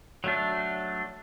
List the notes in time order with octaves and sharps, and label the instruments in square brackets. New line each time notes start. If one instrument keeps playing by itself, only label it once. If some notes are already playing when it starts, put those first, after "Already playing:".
[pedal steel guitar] F#3 A3 D4